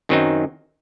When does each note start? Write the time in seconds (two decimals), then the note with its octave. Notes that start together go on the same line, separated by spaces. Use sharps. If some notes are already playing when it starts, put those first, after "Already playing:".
0.09 F#2 D#3 F#3 C4 D#4